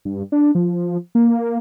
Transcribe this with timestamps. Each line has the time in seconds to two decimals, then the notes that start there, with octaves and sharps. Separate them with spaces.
0.05 G2
0.32 D4
0.55 F3
1.15 A#3